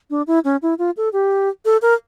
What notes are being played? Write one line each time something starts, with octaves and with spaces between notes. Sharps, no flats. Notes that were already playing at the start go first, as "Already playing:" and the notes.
D4
E4
C#4
E4
F4
A4
G4
A4
A#4